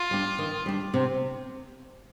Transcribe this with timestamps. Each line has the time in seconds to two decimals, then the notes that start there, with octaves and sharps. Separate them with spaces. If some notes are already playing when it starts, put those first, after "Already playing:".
Already playing: F4
0.11 G3 D4
0.38 D#3
0.66 G3 D4
0.94 C3